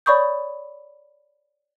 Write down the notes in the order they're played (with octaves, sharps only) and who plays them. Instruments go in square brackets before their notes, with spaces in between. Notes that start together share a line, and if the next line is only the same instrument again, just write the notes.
[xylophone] C#5 D5 B5 C#6 D#6 G6